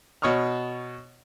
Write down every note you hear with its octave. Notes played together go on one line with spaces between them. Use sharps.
B2 C#5 C#6 D#6 F6